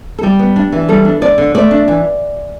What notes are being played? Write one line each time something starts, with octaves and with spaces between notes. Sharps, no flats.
A4
G3 G4
B3
D4
E3
G3 A4
D4
D3 D5
D3
A3 D5
D4
E3